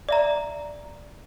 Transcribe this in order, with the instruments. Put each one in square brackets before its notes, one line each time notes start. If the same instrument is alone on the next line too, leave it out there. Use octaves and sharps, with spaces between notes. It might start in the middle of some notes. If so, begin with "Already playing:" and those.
[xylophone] D5 E5 A#5